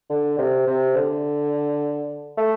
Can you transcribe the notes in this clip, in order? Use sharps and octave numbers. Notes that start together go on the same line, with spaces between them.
D3
C3
C3
D3
A3